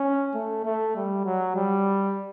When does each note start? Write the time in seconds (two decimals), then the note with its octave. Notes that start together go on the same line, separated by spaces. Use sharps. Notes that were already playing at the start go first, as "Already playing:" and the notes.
Already playing: C#4
0.35 A3
0.65 A3
0.96 G3
1.25 F#3
1.55 G3